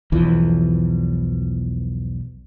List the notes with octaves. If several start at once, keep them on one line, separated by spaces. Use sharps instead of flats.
B1 E2 E3 F3